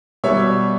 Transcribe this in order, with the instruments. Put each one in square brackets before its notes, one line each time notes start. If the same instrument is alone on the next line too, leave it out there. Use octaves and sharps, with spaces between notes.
[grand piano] B2 G3 C#5 E5